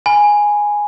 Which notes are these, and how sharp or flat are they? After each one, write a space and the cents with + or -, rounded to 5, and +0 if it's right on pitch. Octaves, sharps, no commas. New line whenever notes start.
G#5 +0 B5 +0